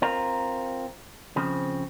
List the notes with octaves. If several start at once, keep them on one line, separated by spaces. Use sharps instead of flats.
C4 F4 A#4
C#3 F3 C4